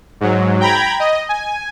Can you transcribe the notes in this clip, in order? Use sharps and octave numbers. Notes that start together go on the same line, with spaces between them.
G#2 F#3
G5 A#5 B5 G#6
D#5
G#5